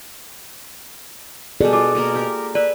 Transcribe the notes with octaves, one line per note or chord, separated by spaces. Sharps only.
B2 G3 G#4 A4 D5
F4 D6
B2 A#3 A#4
G4 A#4
B4 D5 E5